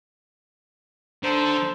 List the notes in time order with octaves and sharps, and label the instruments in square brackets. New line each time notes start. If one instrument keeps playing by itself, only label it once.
[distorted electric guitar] D3 [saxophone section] D#4 A4 C5